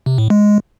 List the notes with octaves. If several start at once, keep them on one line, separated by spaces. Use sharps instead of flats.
C3
A2
G#3